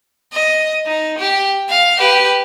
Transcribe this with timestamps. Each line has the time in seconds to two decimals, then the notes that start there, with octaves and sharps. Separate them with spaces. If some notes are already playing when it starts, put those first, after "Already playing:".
0.33 D#5
0.86 D#4
1.18 G4
1.69 F5
1.97 G4 B4